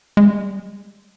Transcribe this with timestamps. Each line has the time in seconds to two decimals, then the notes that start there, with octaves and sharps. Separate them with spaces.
0.17 G#3
0.27 G3